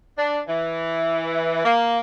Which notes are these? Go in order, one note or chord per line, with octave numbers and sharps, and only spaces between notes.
D4
E3
A#3